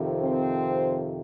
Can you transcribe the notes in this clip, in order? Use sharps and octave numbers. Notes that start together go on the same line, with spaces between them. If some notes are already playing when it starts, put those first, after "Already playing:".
Already playing: F2 C3 D#3
C4 C5